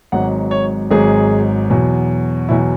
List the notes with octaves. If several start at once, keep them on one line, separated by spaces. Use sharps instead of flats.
G#1 G#2 F#3 F#5
C#5
G#1 G#2 F#3 G#4
E2 B2 F#3
E2 B2 F#3 E4